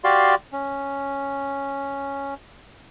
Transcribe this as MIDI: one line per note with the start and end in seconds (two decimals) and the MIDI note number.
0.04 0.35 66
0.04 0.35 67
0.04 0.35 74
0.04 0.35 77
0.04 0.35 84
0.53 2.34 61